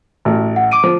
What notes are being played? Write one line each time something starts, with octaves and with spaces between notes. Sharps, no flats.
A1 F#4
F#5
D6 D7 D#7
F3